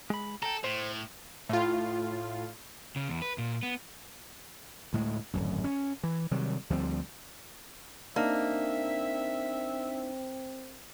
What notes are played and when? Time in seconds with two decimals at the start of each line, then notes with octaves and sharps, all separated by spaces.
0.10 G#3 B5
0.43 A4 G5 A#5
0.64 A2 C5
1.49 A2 F4
2.96 C#3
3.08 E2
3.22 B4
3.38 A#2
3.63 B3
4.93 D2 A2 G#3
5.33 D1 G#1 F#2
5.64 C#4
6.03 E3
6.31 C3 D#3 F#3 G3
6.70 D2 F3 G3 C4
8.16 A#3 C4 D4 D#4 E5